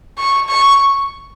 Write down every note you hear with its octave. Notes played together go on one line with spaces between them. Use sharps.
C#6
C#6